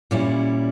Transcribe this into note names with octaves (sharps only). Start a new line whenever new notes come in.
A#2 G3 C#4 E4